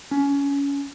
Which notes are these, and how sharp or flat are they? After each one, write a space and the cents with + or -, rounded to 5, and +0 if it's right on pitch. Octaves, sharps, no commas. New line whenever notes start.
C#4 +25